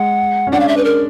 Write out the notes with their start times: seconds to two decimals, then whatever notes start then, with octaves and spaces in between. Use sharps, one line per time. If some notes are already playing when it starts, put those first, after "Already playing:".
Already playing: G#3 F#5
0.47 C#4
0.52 D4 F#5
0.60 F5
0.68 E5
0.77 B4
0.85 A#4